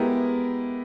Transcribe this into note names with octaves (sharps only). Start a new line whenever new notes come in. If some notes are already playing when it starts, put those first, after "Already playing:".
Already playing: G#3 B3 E4 G4 A#4